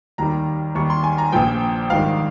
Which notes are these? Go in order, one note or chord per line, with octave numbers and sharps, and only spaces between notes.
D#2 D#3 G3 A#5
D#2 D#3 G3 C#6
C6
G#5
A#5
A#1 A#2 F3 G5
A#1 G#2 D#3 G3 F5